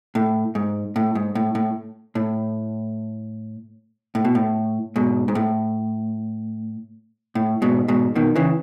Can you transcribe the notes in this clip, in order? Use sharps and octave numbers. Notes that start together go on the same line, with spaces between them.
A2
G#2
A2
G#2
A2
A2
A2
A2
B2
A2
G#2 B2
G#2
A2
A2
G#2 B2
G#2 B2
B2 D#3
C#3 E3